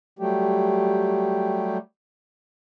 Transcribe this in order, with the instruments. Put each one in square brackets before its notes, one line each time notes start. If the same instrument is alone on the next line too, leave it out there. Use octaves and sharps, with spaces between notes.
[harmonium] F#3 G3 A3 G4